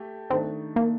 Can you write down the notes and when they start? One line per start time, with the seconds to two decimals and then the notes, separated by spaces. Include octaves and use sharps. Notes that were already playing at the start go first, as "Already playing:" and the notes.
Already playing: A3 G4
0.30 D#3 A3 C4 D4
0.76 A#3